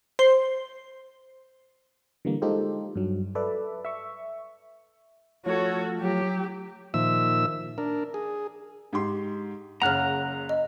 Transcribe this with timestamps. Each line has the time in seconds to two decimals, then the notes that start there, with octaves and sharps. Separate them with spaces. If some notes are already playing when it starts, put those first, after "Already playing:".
0.19 C5
2.25 D3 E3 G3 A#3
2.42 G#3 D#4 F4 G4 A4 C5
2.95 G2 F#3
3.35 A4 B4 D5 E5
3.85 E5 C#6
5.46 F3 A3 F4 F#4 A4 C#5
6.01 F#3 G4
6.94 A#2 D#3 F3 E5 E6
7.78 D4 A#4
8.14 G#4
8.93 G#2 G4 C6
9.82 F#1 C#3 F#5 A#5 F6 F#6
10.49 D#5